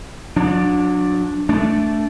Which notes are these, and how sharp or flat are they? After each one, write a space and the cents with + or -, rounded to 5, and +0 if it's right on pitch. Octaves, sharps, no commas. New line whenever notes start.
F#3 -35 D4 +0
A3 +0 D4 -15